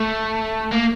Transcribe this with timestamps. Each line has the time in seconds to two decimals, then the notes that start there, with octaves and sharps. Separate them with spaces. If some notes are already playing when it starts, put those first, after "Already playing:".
Already playing: A3
0.72 A#3